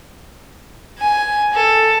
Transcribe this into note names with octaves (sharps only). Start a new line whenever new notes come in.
G#5
A4